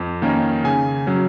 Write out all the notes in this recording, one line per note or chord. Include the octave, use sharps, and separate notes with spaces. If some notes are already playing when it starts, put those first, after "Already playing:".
Already playing: F2
D#3 A#3 C#4
C#3 G#5
F#3 C#4